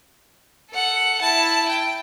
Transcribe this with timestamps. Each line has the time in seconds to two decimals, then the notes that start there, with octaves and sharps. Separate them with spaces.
0.71 A4 F#5
1.21 E4 A5
1.68 G5